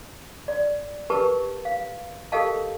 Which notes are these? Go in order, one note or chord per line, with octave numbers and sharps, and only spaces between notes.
D5
G4 A#4 B4 A5 C#6
F5
G4 A4 A#4 D#5 F5 A5